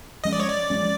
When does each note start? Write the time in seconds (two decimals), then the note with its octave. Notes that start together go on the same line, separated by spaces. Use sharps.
0.24 F3 G#3 C#4 D#5
0.33 D5
0.40 C#5
0.48 D5
0.70 F3 G#3 C#4